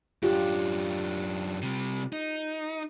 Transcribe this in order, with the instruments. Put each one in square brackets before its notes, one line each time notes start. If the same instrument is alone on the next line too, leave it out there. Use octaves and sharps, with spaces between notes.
[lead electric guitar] F#2 D4 [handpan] F4 G4
[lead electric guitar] C3 G3
D#4